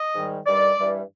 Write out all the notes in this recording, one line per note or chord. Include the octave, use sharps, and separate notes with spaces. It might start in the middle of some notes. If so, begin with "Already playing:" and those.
Already playing: D#5
G#2 D#3 G3
G2 D#3 G3 D5
G2 E3 G3